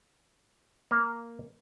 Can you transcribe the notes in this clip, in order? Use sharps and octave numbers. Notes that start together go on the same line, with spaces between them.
A#3